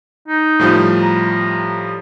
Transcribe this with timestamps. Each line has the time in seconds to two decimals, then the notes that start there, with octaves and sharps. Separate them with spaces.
0.28 D#4
0.60 A2 F3 G3
1.02 A#5